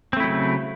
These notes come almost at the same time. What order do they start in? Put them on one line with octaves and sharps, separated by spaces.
C4 A3 E4 F#3 C#3